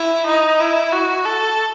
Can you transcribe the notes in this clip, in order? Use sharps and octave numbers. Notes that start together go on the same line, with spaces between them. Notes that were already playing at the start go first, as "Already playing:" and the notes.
Already playing: E4
D#4
E4
F#4
A4